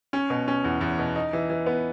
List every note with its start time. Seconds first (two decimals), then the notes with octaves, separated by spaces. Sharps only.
0.13 C#4
0.30 B2
0.48 C#4
0.64 E2
0.81 E2
0.98 B2
1.16 D#4
1.33 E3
1.50 E3
1.66 B3